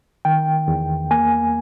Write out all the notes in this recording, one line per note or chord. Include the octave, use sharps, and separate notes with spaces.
D#3 G5
E2
A#3 G#5